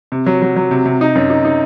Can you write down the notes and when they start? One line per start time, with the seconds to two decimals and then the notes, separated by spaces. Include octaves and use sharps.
0.12 C3
0.26 F#3
0.42 F#3
0.56 F#3
0.71 C3
0.85 C3
1.01 D#4
1.15 F#2
1.30 D#4
1.45 D#4